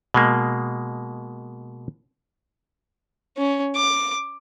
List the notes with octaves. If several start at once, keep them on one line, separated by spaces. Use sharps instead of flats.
B2 G#3 A#3
C#4
D6